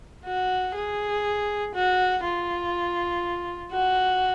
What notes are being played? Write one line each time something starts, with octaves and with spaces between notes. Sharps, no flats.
F#4
G#4
F#4
F4
F#4